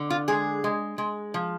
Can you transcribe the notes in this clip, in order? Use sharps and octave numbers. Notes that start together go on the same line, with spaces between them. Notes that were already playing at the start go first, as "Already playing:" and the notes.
Already playing: D3
F4
G#3 G#4
G#3
G#3
F3